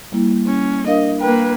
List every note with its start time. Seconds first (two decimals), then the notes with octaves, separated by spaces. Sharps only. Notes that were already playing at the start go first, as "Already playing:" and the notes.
0.12 G3 A#3 E4
0.47 C#4
0.87 D4 A#4 D#5 F5
1.21 A#3 B4 G5